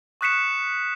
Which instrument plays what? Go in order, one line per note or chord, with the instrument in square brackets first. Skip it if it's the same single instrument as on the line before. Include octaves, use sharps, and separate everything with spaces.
[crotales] C#6 D#6 F#6 B6 C#7 E7